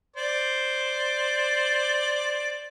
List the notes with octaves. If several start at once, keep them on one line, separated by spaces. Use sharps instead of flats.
C5 D5